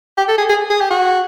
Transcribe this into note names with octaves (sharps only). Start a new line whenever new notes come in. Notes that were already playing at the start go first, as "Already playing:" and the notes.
G4
A4
G#4
G#4
G#4
G4
F#4